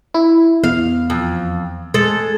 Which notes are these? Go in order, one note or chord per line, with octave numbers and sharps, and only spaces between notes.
E4
E2 F5
F2
G#3 A4